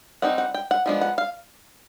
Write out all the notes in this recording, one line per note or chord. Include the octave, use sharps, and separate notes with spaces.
G3 C4 D#4 F#5
F#5
G5
F#5
F3 G#3 B3 D4
F#5
F5